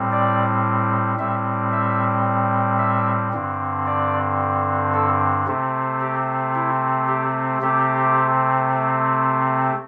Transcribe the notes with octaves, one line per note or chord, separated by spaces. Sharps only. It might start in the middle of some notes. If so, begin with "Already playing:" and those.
Already playing: A2 G3 C4
D5
A2 G3 C4 E5
E5
E5
G2 D3 C4
D5
A4
C3 A3 C4
G4
E4
G4
C3 A3 C4 G4